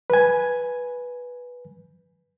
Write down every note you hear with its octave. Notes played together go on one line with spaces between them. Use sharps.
B4 G#5